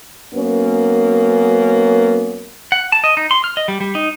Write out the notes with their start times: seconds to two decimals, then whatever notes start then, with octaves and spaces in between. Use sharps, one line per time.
0.33 F#2 A#3 B3 C#4
2.72 F#5
2.92 A5
3.04 D#5
3.17 D#4
3.31 C6
3.44 F6
3.57 D#5
3.68 G3
3.80 G3
3.95 D#4